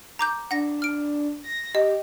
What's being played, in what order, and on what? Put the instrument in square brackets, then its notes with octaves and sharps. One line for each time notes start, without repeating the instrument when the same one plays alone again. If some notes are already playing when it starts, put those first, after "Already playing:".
[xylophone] A#5 D6 G6
[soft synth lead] D4 [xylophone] F#5 A#6
[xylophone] F6 D7
[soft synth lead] A#6
[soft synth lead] G4 [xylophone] D#5